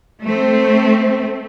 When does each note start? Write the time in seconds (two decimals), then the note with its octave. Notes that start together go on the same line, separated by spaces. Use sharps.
0.23 A3 C4